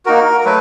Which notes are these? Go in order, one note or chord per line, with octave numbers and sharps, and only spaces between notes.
A#3 D#4 F#4 A#4
A#4
F#3 A3 B4